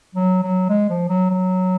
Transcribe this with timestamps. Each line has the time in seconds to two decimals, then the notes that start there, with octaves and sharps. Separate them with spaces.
0.15 F#3
0.43 F#3
0.69 G#3
0.89 F3
1.09 F#3
1.30 F#3